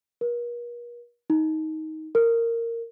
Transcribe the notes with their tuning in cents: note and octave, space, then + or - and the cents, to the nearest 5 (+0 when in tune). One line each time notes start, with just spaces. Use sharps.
A#4 +45
D#4 +15
A#4 -15